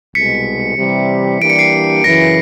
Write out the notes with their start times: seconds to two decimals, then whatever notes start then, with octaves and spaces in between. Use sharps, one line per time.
0.15 C2 B2 G#3 B6 C#7
0.78 C3 E3 G3
1.42 E3 G3 A#3 D4 G4 D7
1.50 C#7
1.59 C7 D7
2.04 F#2 C#3 E3 A#6